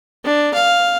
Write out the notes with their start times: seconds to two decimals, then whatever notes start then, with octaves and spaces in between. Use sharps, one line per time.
0.25 D4
0.54 F5